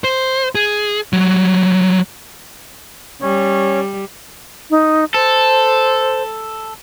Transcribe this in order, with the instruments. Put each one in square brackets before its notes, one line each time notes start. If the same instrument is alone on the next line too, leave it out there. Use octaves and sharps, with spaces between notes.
[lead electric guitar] C5
G#4
F#3 G3
[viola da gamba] G3 [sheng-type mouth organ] C#4 C#5
[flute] D#4
[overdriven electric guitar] A4 [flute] C5